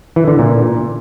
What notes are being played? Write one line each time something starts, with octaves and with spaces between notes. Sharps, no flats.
E3
D3
A#2